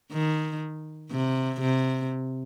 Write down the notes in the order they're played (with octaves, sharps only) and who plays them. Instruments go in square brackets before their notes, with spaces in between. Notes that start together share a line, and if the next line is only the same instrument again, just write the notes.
[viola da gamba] D#3
C3
C3